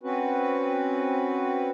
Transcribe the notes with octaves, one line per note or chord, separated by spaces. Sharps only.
C4 C#4 F#4 B4